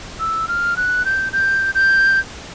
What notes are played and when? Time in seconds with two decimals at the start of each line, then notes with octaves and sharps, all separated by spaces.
0.20 E6
0.48 F6
0.77 F#6
1.05 G6
1.33 G6
1.75 G6